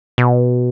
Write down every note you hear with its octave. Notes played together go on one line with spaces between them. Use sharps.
B2